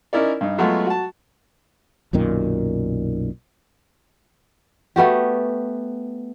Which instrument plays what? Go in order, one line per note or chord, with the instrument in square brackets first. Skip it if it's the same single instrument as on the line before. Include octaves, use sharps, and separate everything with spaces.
[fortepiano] C#4 D#4 E4 A#4 D5
G2 D#4
F#3 G#3 A3 B3 F4 F#4
F#4 A5
[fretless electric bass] B1 F#2 A#2 D#3
[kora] A3 B3 F#4 G4